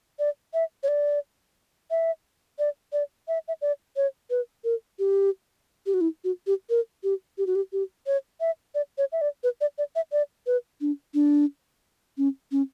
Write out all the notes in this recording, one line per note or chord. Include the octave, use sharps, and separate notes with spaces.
D5
E5
C#5
D5
E5
D5
D5
E5
E5
D5
C#5
B4
A#4
G4
G4
F#4
E4
F#4
G4
A#4
G4
G4
F#4
G4
G4
C#5
E5
D5
C#5
E5
D5
B4
D5
D5
E5
D5
B4
D4
D4
C#4
C#4